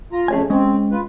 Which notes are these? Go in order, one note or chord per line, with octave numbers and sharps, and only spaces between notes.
F4 A#5
F2 C#3 A3 G#4 C#5 G#5
G#3 C4 C#4
F4 B4